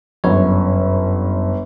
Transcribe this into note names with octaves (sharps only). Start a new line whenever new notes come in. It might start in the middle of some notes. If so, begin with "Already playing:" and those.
G1 F#2 C#5